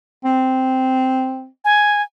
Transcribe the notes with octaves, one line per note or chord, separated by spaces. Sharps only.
C4
G#5